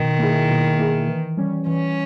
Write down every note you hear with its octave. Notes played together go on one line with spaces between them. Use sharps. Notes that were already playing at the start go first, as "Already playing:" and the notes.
Already playing: B2 D#3
A#3 E4 G#4
B2
A#3 E4 G#4
E3
G3 C#4
E3 C#4